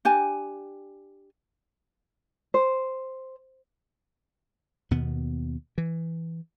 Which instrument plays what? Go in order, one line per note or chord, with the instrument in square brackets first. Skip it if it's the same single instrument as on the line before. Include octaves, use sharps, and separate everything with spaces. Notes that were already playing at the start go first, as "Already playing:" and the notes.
[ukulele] D4 G4 G#5
C5
[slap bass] D#2 B2 B3
E3